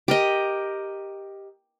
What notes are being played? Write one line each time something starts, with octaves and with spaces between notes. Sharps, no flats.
G4 A#4 D#5